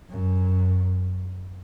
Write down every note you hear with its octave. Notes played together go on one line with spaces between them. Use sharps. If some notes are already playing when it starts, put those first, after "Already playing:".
F#2